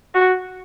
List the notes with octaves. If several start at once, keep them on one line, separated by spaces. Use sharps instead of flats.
F#4